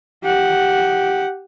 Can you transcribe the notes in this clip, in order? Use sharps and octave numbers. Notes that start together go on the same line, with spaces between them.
G4 F#5